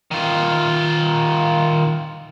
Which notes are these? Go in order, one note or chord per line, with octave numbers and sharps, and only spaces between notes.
D#3 F4